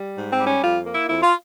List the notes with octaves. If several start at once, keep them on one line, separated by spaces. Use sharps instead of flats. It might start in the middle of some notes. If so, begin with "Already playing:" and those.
Already playing: G3
G#2
C4
G3
C#4
F2 F4
A#3
E4
F2 E4
F4